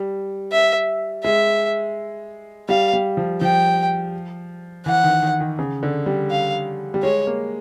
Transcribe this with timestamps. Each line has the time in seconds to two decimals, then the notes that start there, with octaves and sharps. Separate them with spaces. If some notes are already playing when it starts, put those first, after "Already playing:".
Already playing: G3
0.52 E5
1.24 G#3 E5
2.69 G3 F5
2.93 G3
3.17 F3
3.41 F3 G5
4.86 E3 F#5
5.03 D#3
5.22 D#3
5.40 D#3
5.59 C#3
5.83 D3
6.06 G3
6.31 F5
6.94 G3
7.03 G#3 C#5
7.27 A#3